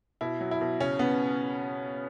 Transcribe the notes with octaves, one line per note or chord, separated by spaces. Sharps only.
B2 E4
F#3
E4
B2
C#3 C#4
C#3 B3